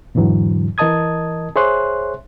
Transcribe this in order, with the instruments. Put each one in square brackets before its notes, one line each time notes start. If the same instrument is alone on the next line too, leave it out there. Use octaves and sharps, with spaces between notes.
[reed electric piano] E2 G#2 D3 E3 F#3
E3 A#4 D#5 A5 D#6 G#6
G#4 C5 C#5 E5 C6 F#6